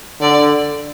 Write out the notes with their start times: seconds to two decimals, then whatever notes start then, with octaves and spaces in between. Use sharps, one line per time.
0.21 D3 D5